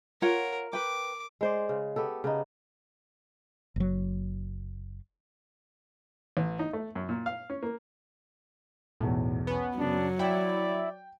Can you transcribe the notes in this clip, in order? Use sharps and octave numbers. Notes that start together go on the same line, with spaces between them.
F4 A#4 C#5 F#5
B4 G5 D6
G#3 C5 D5
C#3
B3 G4 A4
C#3 B3 D#4
F#1 F#3
A1
D#4
A3
F#2
A#2
F5
C#4
A#3
B1 E2 A2
B3 C#4
F#2 C#3 F#3 D4
E4 D5 G5